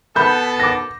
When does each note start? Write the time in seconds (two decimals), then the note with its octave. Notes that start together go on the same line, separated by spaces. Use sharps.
0.16 B2 B3 A4 B5 G6
0.60 D6 A#6